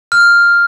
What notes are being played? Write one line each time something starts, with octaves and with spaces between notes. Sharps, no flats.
F6